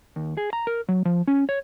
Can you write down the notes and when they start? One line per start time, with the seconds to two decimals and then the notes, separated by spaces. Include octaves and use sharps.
0.16 D#2
0.37 G#4
0.53 A#5
0.67 A#4
0.89 F#3
1.05 F3
1.27 C#4
1.49 C#5